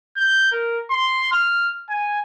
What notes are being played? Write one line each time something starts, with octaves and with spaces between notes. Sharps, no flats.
G6
A#4
C6
F6
G#5